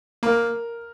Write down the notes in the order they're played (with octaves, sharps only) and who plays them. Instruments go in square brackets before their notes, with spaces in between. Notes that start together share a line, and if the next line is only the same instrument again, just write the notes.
[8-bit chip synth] A#3 [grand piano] A#4